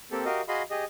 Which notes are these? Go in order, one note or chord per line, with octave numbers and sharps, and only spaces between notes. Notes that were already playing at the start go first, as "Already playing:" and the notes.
A#3 C4 G4 A4
F#4 G4 A#4 D#5 F5
F#4 G#4 D#5 F5 B5 C6
G4 G#4 D#5